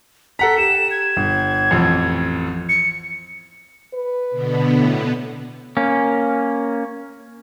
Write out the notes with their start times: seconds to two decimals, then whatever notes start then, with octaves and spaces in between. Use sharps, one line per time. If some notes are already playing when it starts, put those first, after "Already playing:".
0.39 A4 F#5 A#5 B6
0.58 G4 E7
0.91 G#6
1.17 G1
1.71 A1 F2
2.69 C#7
3.94 B4
4.30 B2 D3 B3
4.79 A2
5.77 A#3 C#4